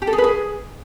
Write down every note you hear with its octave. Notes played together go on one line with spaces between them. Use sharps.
G4
A4
G#4
B4
G#4